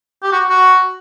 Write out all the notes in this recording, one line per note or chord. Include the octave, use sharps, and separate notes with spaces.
G4
F#4
F#4